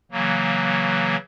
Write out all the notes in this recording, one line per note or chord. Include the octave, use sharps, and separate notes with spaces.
C#3 E3 F#3 A#3